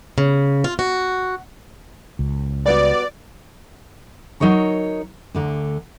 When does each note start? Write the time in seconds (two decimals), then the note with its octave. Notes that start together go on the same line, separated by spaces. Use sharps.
0.18 C#3
0.64 F4
0.79 F#4
2.19 C#2
2.66 G3 B3 F#4 D5
4.40 F#3 D#4 A#4 C#5 A#5
5.35 D2 D3 A#5